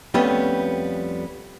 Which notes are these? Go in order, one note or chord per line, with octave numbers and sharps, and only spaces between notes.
F2 G3 A3 B3 C#4 D#5